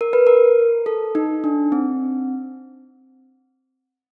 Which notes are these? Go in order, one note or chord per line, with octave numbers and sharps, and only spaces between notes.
A#4
B4
A#4
A4
D#4
D4
C4